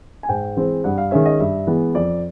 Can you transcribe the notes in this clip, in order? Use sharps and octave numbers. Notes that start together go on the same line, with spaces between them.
G#5
G#2 G5
E3 G#3 C4
G2 F#5
F5
D#3 G#3 C#4 E5
D#5
G2 E5
E3 G#3 B3
F2 D5